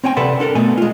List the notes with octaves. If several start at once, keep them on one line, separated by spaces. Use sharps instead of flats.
C4 C#5 G5 G#5
C3 A4 B4 D5 F#5 C6
D4 A4 A#4
B2 A3 B3 G#5
G#3 F4